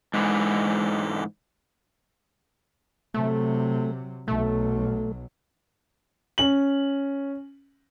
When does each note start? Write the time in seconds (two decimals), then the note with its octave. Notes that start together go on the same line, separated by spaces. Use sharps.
0.14 G#2 D3 E3 G#3
3.14 C3 F#3 A3
4.28 B1 F#3 A3
6.38 C#4 F#7